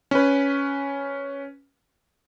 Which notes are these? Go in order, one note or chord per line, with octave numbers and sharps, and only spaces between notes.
C#4 B4